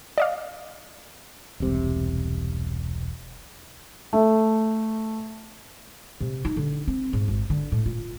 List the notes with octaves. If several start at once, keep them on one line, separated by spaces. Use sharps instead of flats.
D5 D#5 F5
E1 C2 C3
A3
C3
D#4
D3
C4
G#2
G#1
D3
A2
F4